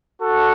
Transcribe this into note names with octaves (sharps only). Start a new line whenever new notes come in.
D4 F#4 A4